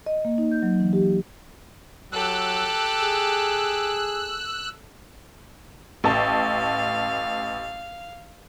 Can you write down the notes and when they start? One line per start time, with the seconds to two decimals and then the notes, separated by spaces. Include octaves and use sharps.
0.06 D#5
0.25 A#3
0.38 D#4
0.51 G6
0.63 F#3
0.80 E3
0.93 G4
2.13 F#3 G4 A4 E6 F#6
3.02 G#4
6.04 A1 F5 A5